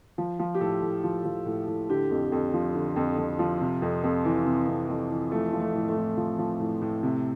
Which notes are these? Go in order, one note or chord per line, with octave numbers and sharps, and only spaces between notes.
F3
F3
G4
A2 A4
A2
F3
F3
A2
A2
D3 G4
F2
F2
F3
D3
F2
F2
F3
C3
F2
F2
E3
C3
F2
F2
E3
F3 A3
F3
A3
A2
A3
A2
F3
F3
A2
A2
C3